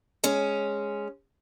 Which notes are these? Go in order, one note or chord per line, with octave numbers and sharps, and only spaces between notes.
G#3 C#4